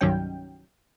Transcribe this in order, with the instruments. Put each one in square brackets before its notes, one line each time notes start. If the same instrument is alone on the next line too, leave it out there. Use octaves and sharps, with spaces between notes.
[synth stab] C2 G2 D#3 F#3 C#4 G5